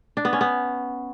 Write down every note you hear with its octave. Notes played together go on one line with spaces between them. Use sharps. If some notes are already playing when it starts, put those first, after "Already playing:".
D4
B3
C#4
B3